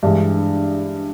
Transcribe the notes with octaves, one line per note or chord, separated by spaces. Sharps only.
G2 E3 G#3